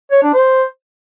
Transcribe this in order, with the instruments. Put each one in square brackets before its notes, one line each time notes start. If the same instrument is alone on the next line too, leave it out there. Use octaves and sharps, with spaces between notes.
[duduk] C#5
D4
C5